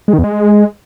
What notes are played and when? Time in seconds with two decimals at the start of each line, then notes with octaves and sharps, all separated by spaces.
0.08 G#3
0.13 D#3
0.19 E2
0.24 G#3